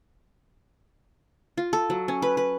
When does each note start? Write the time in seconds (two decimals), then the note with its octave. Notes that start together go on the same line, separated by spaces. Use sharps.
1.57 F4
1.73 A4
1.90 F#3
2.08 C#4
2.22 B4
2.37 B4